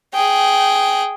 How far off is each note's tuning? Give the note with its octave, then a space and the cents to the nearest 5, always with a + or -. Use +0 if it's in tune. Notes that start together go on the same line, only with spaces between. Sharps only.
G#4 +0 G5 -10